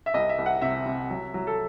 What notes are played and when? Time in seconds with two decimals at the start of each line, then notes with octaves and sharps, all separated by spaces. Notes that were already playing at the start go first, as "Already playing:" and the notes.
0.06 E5
0.14 C2 D#5
0.29 E5
0.38 C2
0.46 F#5
0.62 C3 E5
0.86 C3
1.10 F#3
1.34 F#3
1.47 A4